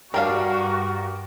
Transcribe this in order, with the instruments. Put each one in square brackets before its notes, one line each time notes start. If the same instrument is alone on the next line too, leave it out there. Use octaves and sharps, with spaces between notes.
[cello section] G2 [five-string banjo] G3 D4 F5 [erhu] F#4 [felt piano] G4 A#4